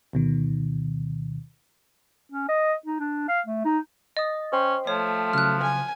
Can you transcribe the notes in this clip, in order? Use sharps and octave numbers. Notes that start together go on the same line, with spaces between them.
D2 B2 D#3
C#4
D#5
D#4
D4
F5
A3
D#4
D#5 D#6 A6
C#4 C5 G5 C6
F3 A3 C#5
C#3 F#3 F6 F#6
G#5